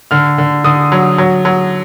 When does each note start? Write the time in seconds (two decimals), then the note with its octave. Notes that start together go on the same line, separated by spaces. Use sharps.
0.11 D3 F6
0.38 D3
0.64 D3 D#6
0.92 F#3
1.18 F#3
1.45 F#3